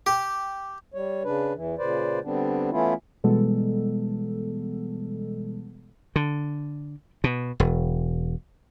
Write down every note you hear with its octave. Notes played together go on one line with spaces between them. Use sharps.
G4
G3 C#5
C#3 D4 B4
E2 E3
A#2 C#3 B4 C5 D5
D3 G3 B3 C4 D4
E3 A3 B3 C#4 E4 F4
B2 E3 G3 G#3 B3 A4
D3
B2
E1